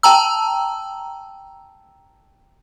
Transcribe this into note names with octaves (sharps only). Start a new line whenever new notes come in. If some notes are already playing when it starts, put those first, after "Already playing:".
G5 A5 A#5 E6